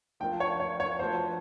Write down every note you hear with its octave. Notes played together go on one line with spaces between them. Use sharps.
F3 A3 D4 F4 A#4 G5
C#5
C#5
C#5
F3 A3 D4 F#4 B4 C5